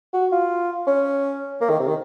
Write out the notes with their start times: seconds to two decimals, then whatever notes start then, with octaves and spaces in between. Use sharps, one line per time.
0.13 F#4
0.32 F4
0.87 C#4
1.61 A#3
1.69 D#3
1.80 C3
1.88 D#3